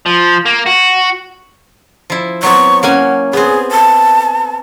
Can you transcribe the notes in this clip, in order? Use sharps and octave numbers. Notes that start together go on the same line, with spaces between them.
F3
A#3
F#4
F3 E4
F#3 B3 C4 C#6
A#3 C#4 F#5 G#5
B3 C4 G#4
A5